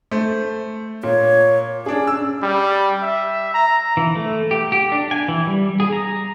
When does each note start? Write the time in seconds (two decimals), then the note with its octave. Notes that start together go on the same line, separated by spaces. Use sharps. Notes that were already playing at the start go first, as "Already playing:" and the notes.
0.11 A3 C5
1.03 A#2 C#5
1.86 C#4 D4 G#4
2.07 E6
2.43 G3
3.02 E5
3.54 A#5
3.97 E3
4.16 A3
4.51 G4
4.72 G4
4.92 D4
5.11 G#5
5.28 E3
5.47 G3
5.80 G#4
5.92 A#5